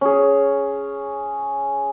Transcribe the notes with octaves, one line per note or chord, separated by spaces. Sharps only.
C#4 G#4